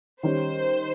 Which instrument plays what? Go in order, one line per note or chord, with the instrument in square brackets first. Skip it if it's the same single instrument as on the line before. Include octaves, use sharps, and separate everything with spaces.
[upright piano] D#3 G3 C#4 [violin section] C5